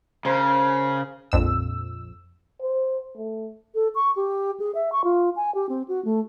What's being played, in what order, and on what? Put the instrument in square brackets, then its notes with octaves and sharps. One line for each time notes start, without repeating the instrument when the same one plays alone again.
[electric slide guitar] C#3 [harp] A#4 C5 G#5
[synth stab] A#1 F2 E6
[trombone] C5
A3
[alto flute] A4
C#6
G4
G#4
E5
C#6
F4
G#5
G4
C4
F#4
A3